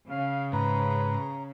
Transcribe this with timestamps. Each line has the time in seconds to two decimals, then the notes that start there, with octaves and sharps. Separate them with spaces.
0.11 C#3 F5
0.53 G#2 B4 A#5